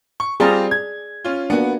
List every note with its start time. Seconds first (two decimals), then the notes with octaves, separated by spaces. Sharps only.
0.20 C#6
0.40 G3 C4 F4 G#4 D5 A#5
0.71 G#6
1.25 C#4 F4
1.50 A#3 B3 D4 F#4